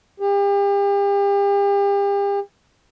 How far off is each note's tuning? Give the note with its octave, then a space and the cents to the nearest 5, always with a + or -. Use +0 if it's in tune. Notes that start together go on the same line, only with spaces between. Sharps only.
G4 +40